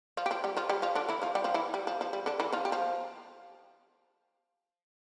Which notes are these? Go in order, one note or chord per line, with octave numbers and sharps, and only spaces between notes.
F3 F4
G4
F3 F4
G3 G4
F3 F4
G3 G4
F3 F4
D3 D4
E3 E4
F3 F4
G3 G4
F3 F4
E3 E4
G3
F3
F3
G3
D3 D4
E3 E4
F3 F4
G4
F3 F4